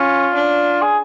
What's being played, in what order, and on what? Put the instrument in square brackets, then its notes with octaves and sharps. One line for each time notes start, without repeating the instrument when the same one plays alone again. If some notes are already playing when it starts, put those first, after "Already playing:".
Already playing: [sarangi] C#4 [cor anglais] F4
[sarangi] D4
[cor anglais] G#4